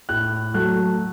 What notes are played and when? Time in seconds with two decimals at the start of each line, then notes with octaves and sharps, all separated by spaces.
0.09 A2 F#6
0.54 F#3 A3 F#6